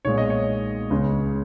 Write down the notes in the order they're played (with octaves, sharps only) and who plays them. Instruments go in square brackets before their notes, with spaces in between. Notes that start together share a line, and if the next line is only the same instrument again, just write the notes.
[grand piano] B1 A#2 G#3 C#5
D#5
C#5
C#2 C#3 G#3 C#4